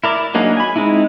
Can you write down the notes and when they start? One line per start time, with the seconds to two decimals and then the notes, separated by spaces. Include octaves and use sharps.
0.04 E4 A#4 D5
0.34 F#3 A#3 D4 D#4 G#4
0.57 G#5 B5
0.76 G#3 C4 D#4 E4